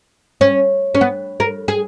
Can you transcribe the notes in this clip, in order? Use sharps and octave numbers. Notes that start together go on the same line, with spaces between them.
C#4
C#4
B3
A#4
G#4